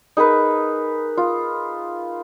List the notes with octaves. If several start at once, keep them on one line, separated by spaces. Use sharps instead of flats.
D#4 G#4 A#4 B4
F4